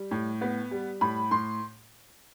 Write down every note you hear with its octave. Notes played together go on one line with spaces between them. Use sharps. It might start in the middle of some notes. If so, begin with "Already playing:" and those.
Already playing: G3
A2
B3
G3
A2 B5
A2 C6